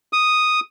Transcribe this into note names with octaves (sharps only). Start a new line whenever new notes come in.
D#6